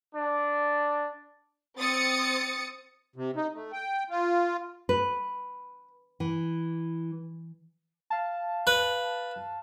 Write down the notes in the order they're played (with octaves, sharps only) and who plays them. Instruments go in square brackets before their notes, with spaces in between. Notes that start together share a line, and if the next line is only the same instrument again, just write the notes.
[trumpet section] D4
[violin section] C4 D#6 A6 C#7
[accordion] C3
D#4
A3
G5
F4
[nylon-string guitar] B4
E3
[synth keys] F5 A5
[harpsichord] B4